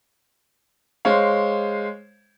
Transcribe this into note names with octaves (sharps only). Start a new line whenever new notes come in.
G#3 C5 C#5 F5